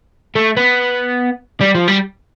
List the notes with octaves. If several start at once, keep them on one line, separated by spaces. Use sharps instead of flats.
A3
B3
G3
F3
G3